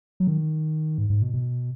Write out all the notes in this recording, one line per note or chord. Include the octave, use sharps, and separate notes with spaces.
F#3
D#3
G#2
G#2
B2
B2